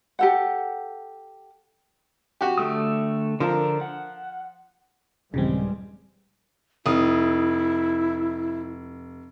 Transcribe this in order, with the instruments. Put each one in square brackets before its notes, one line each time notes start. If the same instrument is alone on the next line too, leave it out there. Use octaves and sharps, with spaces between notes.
[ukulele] G4 A4 F#5
[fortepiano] F#4 G4
[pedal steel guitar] D3 A3 D#6
[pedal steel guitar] D3 A#4 A#5 [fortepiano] F3
[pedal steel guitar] F#5
[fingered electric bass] D#1 [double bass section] G2 G3 G#3 [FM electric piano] C#3 E3 C4
[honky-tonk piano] F1 D#6 [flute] E4